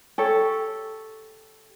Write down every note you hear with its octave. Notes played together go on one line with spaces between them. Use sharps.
G4 A4 C#5